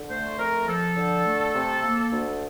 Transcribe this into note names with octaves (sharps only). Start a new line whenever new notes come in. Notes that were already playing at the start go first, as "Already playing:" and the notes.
Already playing: D3
A3 C5
F2 A#4
F3 A4
D3
A3
C3
A#3
D2